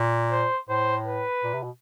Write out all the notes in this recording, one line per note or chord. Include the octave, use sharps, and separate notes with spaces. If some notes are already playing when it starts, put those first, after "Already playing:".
Already playing: A#2
C5
A2 C5
B4
A#2
C3
B2